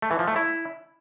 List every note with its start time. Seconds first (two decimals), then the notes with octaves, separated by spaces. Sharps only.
0.02 A3
0.11 E3
0.19 F3
0.28 A3
0.36 E4